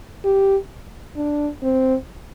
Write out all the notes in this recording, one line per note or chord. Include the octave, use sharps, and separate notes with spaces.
G4
D4
C4